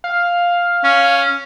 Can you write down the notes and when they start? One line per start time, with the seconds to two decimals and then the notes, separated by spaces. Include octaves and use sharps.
0.04 F5
0.84 C#4